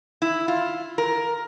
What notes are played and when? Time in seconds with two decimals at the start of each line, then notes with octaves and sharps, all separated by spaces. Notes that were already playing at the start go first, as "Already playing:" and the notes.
0.22 E4
0.48 F4
0.98 A#4